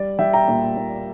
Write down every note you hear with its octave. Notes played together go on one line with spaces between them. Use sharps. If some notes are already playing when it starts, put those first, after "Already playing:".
Already playing: G3 D5
G3 E5 G5
G5 A#5
A#2
A#2